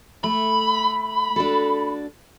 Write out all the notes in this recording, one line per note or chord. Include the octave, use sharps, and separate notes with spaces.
A3 B5
D4 F#4 A4